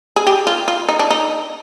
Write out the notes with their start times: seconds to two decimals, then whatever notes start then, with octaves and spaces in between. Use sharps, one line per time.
0.16 G#4
0.27 G4
0.47 F4
0.68 F4
0.89 D#4
0.99 D4
1.10 D#4